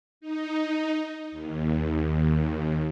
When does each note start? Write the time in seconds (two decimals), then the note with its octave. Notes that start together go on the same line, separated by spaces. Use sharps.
0.21 D#4
1.32 D#2